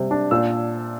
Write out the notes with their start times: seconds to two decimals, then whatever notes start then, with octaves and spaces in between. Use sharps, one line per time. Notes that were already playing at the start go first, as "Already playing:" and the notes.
Already playing: C3 G3
0.11 D4
0.31 A#2 E6